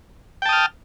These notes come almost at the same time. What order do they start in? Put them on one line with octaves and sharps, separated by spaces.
G5 A5 D#6 F6